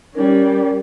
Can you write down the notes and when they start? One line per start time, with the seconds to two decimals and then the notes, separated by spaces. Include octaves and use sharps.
0.15 G3 C#4 A#4